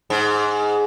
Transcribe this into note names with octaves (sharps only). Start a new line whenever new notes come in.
G#2